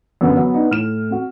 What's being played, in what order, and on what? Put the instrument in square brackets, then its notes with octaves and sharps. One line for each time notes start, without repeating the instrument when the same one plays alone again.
[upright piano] F#2 D3 [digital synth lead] B3
[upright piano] F#3
D4 D#4
[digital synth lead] A2 [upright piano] F6 E7
[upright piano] C4 F#4